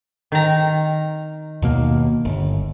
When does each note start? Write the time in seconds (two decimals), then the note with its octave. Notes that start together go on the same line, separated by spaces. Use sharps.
0.32 D#3 A#5
1.62 D#2 B2 A#3
2.25 G1